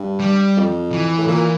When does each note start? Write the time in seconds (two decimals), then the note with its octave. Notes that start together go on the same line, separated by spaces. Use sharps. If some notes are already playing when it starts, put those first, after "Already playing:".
Already playing: G2
0.20 G3
0.57 F2
0.92 E3
1.18 A2
1.27 A#2 E3